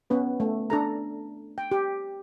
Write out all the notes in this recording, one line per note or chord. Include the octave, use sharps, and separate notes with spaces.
B3 C#4 B4
A3
D4 A4 A#5
G5
G4